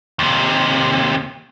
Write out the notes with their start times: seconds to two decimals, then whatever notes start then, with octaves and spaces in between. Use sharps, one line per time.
0.19 D#2 C3